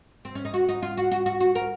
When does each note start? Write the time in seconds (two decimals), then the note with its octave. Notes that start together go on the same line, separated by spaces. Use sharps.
0.25 C4
0.35 C#4
0.45 D#4
0.54 F#4
0.69 D#4
0.82 F4
0.97 F#4
1.11 F#4
1.26 F#4
1.40 F#4
1.55 A#4